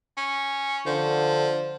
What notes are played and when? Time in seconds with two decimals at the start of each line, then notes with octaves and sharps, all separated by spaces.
0.18 C#4
0.86 D3 F3